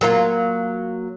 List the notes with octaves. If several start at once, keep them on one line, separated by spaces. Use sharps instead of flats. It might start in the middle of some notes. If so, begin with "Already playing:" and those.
F#3 A#3 F4